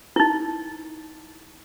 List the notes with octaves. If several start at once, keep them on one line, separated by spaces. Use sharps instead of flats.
D#4 E4